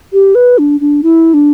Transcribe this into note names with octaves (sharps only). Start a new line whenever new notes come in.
G4
B4
D4
D4
E4
D4